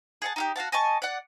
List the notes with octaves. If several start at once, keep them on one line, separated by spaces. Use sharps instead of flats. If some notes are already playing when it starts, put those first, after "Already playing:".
G#4 F#5 A5
D#4 F4 G4
F#4 F5 F#5 A5
D#5 G#5 A5 C#6
D5 F#5